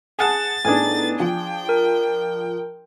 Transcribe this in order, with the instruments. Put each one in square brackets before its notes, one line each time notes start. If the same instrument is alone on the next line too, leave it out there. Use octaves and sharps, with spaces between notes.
[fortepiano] G#4 F#5 A5 [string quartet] A6
[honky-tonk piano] A2 B3 D#4 [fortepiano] D4 G#4 G#5
[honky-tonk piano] F3 [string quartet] G5
[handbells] A#4